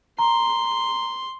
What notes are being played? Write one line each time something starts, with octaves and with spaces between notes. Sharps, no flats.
A#5 C6